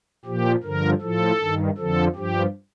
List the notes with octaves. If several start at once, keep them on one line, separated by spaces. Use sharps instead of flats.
A#2 F3 G4
G2 D3 F3 A#4
A2 F3 A4
G2 D#3
F2 D3 F3 A4
G2 F3 G4